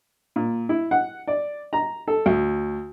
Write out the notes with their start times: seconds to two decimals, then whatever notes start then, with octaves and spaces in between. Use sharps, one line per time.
0.36 A#2
0.69 E4
0.91 F#5
1.27 D5
1.73 A#5
2.08 A4
2.26 D2